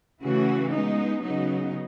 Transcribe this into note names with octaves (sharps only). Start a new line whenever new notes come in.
C#3 E3 A3 C#4 F#4
G#3 B3 D#4
C#3 F#3 B3 D#4